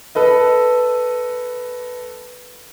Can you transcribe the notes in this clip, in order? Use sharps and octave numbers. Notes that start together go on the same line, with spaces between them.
A4 B4 D#5